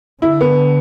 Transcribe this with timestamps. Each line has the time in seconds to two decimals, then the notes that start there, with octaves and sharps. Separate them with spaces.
0.22 D3 E4
0.41 B3